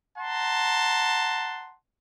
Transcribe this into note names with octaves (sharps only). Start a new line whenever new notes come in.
F#5 A5 A#5 C6